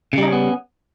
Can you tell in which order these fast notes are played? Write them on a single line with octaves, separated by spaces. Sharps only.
C#3 G3 D#4 C#4 B3